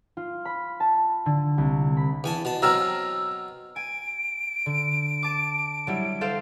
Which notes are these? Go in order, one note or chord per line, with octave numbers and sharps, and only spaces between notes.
F4
B5
A5
D3
C2
B5
E2 G#5 A5
B2 A5
B2 F#3 C4 A#5 E6 F6
G#5 D7
D3
A5 D6
F#3 G3 E4
A4 C5 F5